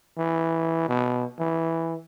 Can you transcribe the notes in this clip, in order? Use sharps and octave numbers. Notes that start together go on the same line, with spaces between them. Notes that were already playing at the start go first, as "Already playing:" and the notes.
E3
B2
E3